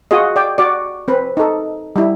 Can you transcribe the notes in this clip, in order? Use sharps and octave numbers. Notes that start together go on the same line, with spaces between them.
F4 F#4 G#4 D#5
D5 G5
F#4 D5
C4 B4
D#4 A4
G3 E4